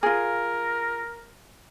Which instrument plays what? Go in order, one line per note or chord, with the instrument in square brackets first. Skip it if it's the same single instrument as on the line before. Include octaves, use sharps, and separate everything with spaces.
[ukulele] F4 G#4 [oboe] A#4